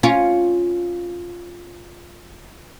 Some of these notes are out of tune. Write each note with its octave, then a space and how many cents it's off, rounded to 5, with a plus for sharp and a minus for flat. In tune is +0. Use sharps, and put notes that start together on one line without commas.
C#4 +0 F4 +0